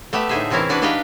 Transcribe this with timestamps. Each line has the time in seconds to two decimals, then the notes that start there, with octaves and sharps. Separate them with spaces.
0.13 A3 B3 G4 E5
0.29 A2 D3 D#4 G#4 C5 E5
0.51 C3 E3 C4 C#4 E4 A#4
0.69 E3 D4 F#4 B4
0.82 D4 D#4 G4 B4 F5 G5